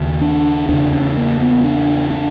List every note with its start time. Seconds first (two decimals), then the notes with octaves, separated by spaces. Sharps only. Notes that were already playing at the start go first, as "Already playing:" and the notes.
Already playing: D#2 C#3
0.21 D4
0.69 E2 C#3 D4
0.92 C#4
1.17 A#3
1.40 B3
1.64 D4
2.10 D4